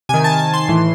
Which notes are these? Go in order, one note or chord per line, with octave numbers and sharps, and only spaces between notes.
C3 D#3 G#5
A5
A5
C6
A2 E3